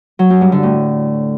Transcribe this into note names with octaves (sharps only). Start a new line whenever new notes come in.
F#3
F#2
G2
D3
A2